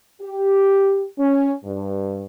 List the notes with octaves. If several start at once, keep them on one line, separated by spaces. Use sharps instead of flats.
G4
C#4
G2